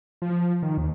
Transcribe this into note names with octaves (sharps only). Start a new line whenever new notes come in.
F3
D#3
D#2